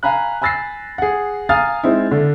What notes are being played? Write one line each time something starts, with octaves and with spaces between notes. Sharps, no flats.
F5 G#5 A#5 B5 F#6
G#5 B5 E6 A6 A#6 C7
G#4 F#5
F5 G#5 A#5 D#6 F6 A6
G#3 C4 D#4 E4
D3